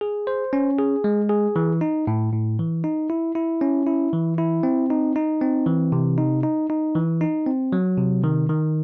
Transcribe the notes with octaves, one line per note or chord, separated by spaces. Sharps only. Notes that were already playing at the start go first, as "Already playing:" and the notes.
G#4
C5
C#4
G#4
G#3
G#4
E3
D#4
A2
A2
E3
D#4
E4
E4
C#4
E4
E3
E4
C4
D#4
D#4
C4
E3
C3
D#4
D#4
D#4
E3
D#4
C4
F#3
C3
D#3
D#3